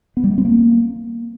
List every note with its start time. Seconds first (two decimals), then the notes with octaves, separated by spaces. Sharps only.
0.17 B3
0.24 G3
0.31 A3
0.38 C4
0.45 A#3